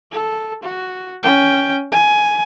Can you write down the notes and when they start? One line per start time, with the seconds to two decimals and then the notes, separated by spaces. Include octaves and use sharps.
0.12 A4
0.63 F#4
1.23 C#4 G5
1.92 G#5